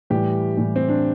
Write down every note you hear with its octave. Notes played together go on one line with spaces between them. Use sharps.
A2 E3 G3 G4
A2 E3 G3
C4
D4